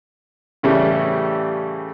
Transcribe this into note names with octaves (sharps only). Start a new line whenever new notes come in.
A2 C#3 E3 G3 A3